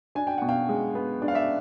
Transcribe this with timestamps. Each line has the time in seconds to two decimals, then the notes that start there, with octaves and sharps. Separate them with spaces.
0.15 D4 G#5
0.27 G5
0.38 B2 F#5
0.49 F5 G5
0.69 G#3
0.95 B3
1.22 D4
1.28 F5
1.34 D5 E5